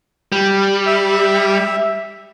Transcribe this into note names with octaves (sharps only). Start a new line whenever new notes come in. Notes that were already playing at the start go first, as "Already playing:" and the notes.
G3
E5